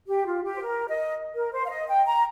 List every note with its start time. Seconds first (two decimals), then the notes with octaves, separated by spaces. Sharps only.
0.07 G4
0.26 F4
0.44 G4
0.54 C5
0.61 A#4
0.89 D#5
1.35 A#4
1.52 C5
1.65 F5
1.70 D#5
1.88 G5
2.06 A#5